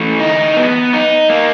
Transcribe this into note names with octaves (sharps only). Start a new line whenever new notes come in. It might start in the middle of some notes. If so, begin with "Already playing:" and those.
Already playing: E3 A3
D#4
B3
D#4
A#3